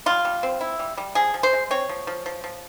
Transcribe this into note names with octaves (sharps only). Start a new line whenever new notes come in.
G3 F4
G3
C4
E4
G3
G3
F3 G#4
F3
C5
G#3
C4 C#5
F3
F3
F3
F3